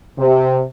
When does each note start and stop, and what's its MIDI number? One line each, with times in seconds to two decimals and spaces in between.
0.18 0.62 48